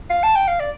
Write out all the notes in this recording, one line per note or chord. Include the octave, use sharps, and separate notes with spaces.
F5
A5
G5
F5
D5